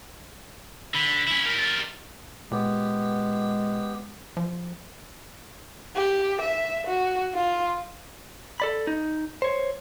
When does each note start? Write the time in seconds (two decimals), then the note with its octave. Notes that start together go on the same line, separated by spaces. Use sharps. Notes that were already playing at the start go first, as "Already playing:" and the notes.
0.94 D3 B5
1.27 C#4 E4
1.45 G3 A#4 B6
1.58 A6
2.51 A#2 G#3 B3 G4
4.37 F3
5.96 G4
6.42 E5
6.87 F#4
7.35 F4
8.60 A4 D5 B5
8.87 D#4
9.42 C5 C#5